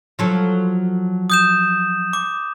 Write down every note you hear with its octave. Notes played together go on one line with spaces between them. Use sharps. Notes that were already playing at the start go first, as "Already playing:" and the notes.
F3 F#3 A4
D#6 G6 E7
D6